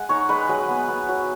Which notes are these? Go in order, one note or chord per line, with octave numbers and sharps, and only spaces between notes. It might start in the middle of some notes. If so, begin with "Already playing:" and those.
Already playing: G#3 F#5 G#5
D#4 C#5
G#3 B4
F#3 G#4
B3
B3
F#3